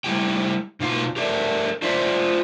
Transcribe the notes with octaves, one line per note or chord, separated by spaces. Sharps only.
G3 A3 A#3 E4 G4 G5
B2 D#4 F4 F5
G4 A4 A#4 D5 E5
F4 C5 D5 E5 F5